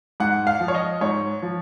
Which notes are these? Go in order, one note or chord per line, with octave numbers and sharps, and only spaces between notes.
G#2 F#5
F5
F3
C#5
D#5
G#2 C#5
F3